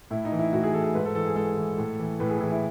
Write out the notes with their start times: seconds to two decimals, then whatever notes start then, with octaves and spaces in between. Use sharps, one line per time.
0.11 A2 E4
0.25 D#4
0.32 E3
0.39 E4
0.53 A2 F#4
0.63 G#4
0.74 E3 A4
0.84 G#4
0.94 G#2 B4
1.05 A4
1.15 E3 A4
1.26 G#4
1.36 G#2 A4
1.57 E3
1.78 A2
1.99 E3
2.20 A2 B4
2.30 G#4
2.40 E3 G#4
2.51 E4